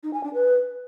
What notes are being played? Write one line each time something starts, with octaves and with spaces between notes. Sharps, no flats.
D#4
G#5
D4
B4